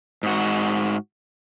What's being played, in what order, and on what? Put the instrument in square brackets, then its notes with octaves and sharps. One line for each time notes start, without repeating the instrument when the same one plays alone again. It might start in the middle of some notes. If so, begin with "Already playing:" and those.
[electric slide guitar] G#2 F#4